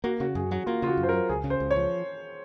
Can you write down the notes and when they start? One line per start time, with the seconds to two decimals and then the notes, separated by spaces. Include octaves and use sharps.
0.04 A#3 F#4
0.20 C#3 F#4
0.35 F#2 G#4
0.51 F#3 F#4
0.66 A#3 F4
0.82 C#3 F4
0.87 F#4
0.97 F#2
1.03 C5
1.09 A#4
1.13 F#3
1.29 C#2 G#4
1.44 C#3
1.50 C5
1.60 C#2
1.71 C#5
1.76 F3